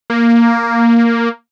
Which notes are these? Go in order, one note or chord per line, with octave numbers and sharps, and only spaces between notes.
A#3